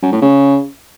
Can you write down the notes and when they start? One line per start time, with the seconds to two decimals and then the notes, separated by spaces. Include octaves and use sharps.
0.02 F#2
0.12 A2
0.22 C#3